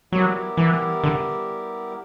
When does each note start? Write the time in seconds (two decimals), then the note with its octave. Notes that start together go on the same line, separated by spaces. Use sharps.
0.12 F#3 G3 B3 E4 G4 A#4
0.57 E3
1.04 D3